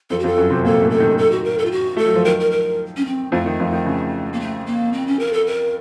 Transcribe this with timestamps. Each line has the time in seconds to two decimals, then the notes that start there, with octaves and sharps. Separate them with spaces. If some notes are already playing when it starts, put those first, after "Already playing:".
0.10 F2 F3 A4
0.20 F#4
0.24 F2 F3 A4
0.38 F#2 F#3
0.50 C3 C4
0.64 A#2 A#3 A4
0.82 A2 A3
0.91 A4
1.00 D#3
1.18 A4
1.32 F#4
1.44 A#4
1.58 A4
1.66 F4
1.71 F#4
1.97 A3 A4
2.06 F#3
2.16 F3
2.25 D#3 A#4
2.40 A#4
2.52 A#4
2.97 C#4
3.05 C4
3.32 F2 F3 A3
3.46 D#3
3.60 F2 F3
3.73 D#3
3.86 C#3
4.33 A#3
4.40 A3
4.66 A#3
4.93 C4
5.07 C#4
5.20 A#4
5.33 A4
5.46 A#4